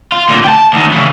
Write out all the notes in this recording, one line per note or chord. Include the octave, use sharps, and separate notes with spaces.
F4
D2 A#2
G5 A5
D2 D#3
C#3 E3